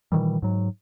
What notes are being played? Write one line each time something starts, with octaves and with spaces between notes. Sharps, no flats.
A#2 D#3 E3 G3
G#2 F#3